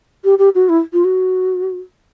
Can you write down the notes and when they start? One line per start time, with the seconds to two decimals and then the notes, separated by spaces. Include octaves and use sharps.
0.24 G4
0.38 G4
0.55 F#4
0.69 E4
0.93 F4
1.04 F#4